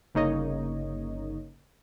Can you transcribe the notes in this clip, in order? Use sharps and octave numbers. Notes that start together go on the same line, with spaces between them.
G1 C#3 A#3 D#4 C#5 D#5